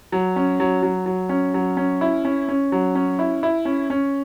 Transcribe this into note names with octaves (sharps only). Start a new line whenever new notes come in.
F#3
C#4
F#3
F#3
F#3
C#4
F#3
C#4
E4
C#4
C#4
F#3
C#4
E4
E4
C#4
C#4